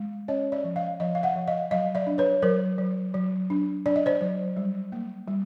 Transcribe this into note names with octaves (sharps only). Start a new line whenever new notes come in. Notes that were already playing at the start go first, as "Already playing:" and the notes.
Already playing: G#3
C#4 C#5 D#5
D5 E5
F3
D#5 F5
F3 D#5 F5
F5
E5 F#5
F3
D#5 F5
F#3 D#5 F5
D5 E5
D4
B4 C#5
F#3 A#4 C5
F#3
F#3
D4
D4 D5
D#5
C5 D5
F#3
G3
A#3
G3